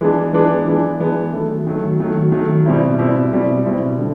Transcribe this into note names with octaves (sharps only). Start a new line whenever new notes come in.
E3 G#3 B3 D4
E3 G#3 B3 D4
E3 G#3 B3 D4
E3 G#3 B3 D4
D#3 F#3 A3
D#3 F#3 A3
D#3 F#3 A3
D#3 F#3 A3
B2 G3 C4 E4
B2 G3 C4 E4
B2 G3 C4 E4
B2 G3 C4 E4
D3